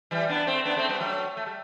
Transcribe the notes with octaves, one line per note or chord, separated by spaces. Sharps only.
E3 G3
B3 D4
A3 C4
B3 D4
A3 C4
G3 B3
F#3 A3
A3
G3